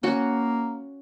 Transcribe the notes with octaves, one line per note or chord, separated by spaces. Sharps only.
A#3 C#4 F#4